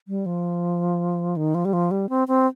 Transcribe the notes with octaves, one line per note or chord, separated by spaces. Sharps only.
G3
F3
D#3
F3
G3
F3
G3
C4
C4